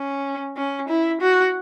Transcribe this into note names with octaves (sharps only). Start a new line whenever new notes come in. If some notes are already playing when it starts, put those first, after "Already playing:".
Already playing: C#4
C#4
E4
F#4